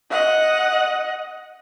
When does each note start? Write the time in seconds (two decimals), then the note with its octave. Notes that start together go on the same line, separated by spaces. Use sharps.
0.10 D#5 F#5